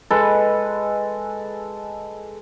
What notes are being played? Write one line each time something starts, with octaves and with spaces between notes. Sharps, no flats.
G#3 A4 B4